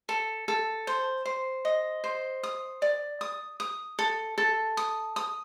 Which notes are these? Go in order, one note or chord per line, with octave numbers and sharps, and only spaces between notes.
A4
A4
C5
C5
D#5
C5
D#6
D5
D#6
D#6
A4
A4
D#6
D#6